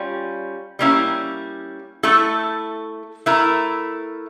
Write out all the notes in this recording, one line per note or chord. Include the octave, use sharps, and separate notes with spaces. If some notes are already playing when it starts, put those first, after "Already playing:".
Already playing: G3 C#4 F4
G3 A#3 C#4 E4
A3 E4 A4
A3 E4 A#4